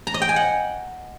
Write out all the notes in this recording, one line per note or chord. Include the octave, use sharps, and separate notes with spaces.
A#5
D#5
G5
G#5
F#5